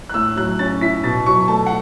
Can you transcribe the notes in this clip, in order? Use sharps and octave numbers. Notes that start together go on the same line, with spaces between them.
F#6
A2 E6
F#3 F#6
C#4 A6
E4 B6
B2 A6
F#3 C#6
A3 A5
F#5